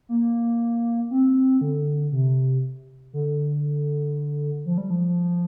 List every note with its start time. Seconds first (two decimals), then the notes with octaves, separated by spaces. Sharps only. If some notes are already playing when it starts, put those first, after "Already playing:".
0.09 A#3
1.11 C4
1.61 D3
2.12 C3
3.13 D3
4.66 F3
4.78 G3
4.90 F3